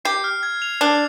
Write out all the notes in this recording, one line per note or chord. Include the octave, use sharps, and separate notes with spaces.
G4 C7
F6
G#6
F7
D4 C7